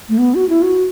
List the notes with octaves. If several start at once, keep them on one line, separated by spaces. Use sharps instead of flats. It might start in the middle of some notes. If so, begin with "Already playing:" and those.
A3
B3
F#4
E4
F#4